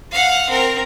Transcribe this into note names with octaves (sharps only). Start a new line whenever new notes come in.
F5 F#5
C4 A#4